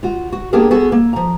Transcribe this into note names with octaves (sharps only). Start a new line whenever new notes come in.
F4 F#4
F#4
A#3 B3 D4 G4 G#4 A#4
B3 F#4 G#4 A4
A#3
F3 A#5